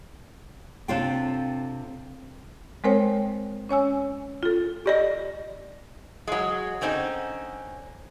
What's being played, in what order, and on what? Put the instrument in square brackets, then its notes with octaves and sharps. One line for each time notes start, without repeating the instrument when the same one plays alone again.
[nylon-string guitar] C3 C4 D4 F4 A4 G5
[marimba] G#3 C4 A#4 C5 C#5 G5
C#4 C#5 G#5 E6
F4 A4
[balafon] G4 D5 D#5
[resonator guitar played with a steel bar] F#3 G#3
D3 C4 C#4 D#4